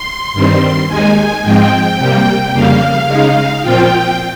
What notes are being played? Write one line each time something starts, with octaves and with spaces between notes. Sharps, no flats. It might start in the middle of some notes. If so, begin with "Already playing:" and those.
Already playing: C6
G2 D#3 G3 C4
D#2 D#3 G#3 D#4 G#5
G#2 F3 G#3 C4 G5
C3 G3 A#3
F2 C#3 G3 A#3 F5
C#3 G#3 D#4
A#2 F3 C4 F4 G5